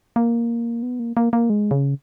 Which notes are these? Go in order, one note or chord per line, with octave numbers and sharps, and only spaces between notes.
A#3
B3
A#3
A#3
A#3
G#3
C#3